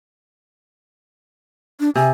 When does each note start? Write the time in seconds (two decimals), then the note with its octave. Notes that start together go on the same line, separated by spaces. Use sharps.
1.80 D4
1.95 C3 G#5